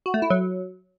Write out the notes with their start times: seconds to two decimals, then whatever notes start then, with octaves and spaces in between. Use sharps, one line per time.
0.06 F#4
0.14 A3
0.22 E4
0.30 F#3